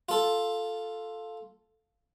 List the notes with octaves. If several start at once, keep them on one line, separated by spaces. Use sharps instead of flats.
F4 A4